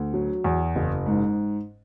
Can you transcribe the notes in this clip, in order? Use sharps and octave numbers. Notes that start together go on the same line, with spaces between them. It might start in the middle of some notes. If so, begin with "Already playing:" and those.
Already playing: D2
F#3
E2
F#1
G#2